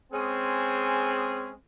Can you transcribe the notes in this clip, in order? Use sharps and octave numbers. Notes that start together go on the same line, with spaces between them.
G#3 C4 C#4 G#4